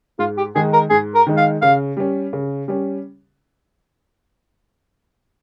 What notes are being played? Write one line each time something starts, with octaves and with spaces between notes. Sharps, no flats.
G#2 F4
G4
D#3 G#3 D#4 G#4
A#4
G#2 G#4
A#4
D#3 G#3 D#4
F5
C#3 F5
G3 C#4
C#3
G3 C#4